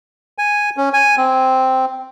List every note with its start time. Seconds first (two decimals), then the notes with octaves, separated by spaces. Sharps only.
0.38 G#5
0.77 C#4
0.93 G#5
1.17 C4